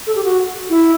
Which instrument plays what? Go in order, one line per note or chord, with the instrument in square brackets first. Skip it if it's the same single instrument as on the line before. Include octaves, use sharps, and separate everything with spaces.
[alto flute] A4
G4
F#4
E4